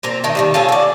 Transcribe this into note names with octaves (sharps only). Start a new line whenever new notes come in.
A#2 C4 A#5
D#3 A3 D#4
D#3 F#3 G3
F4 G#4 A4 C#5
F#4 D5